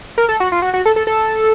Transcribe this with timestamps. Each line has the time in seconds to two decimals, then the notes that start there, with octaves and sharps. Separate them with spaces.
0.18 A#4
0.29 A4
0.40 F#4
0.52 F4
0.62 F#4
0.74 F#4
0.86 A4
0.96 A4
1.07 A4